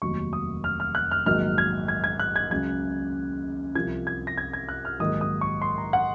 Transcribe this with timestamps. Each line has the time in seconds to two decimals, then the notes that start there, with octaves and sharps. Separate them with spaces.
0.02 F1 D#2 D#3 F#3 C#6
0.33 D#6
0.64 F6
0.80 F6
0.95 F#6
1.11 F6
1.26 A#1 G#2 D#3 F#3 F6
1.58 G#6
1.88 G#6
2.04 G#6
2.19 F#6
2.36 G#6
2.51 C#2 C#3 F#3 G#6
3.75 C2 C3 F3 G#6
4.07 G#6
4.27 A#6
4.38 G#6
4.53 G#6
4.69 F#6
4.85 F6
5.00 A#1 G#2 D#3 F#3 D#6
5.21 D#6
5.41 C#6
5.62 C6
5.78 A#5
5.93 F#5